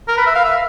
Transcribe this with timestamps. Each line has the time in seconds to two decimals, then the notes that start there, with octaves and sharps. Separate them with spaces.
0.08 A#4
0.17 B4
0.26 E5
0.35 F5
0.44 E5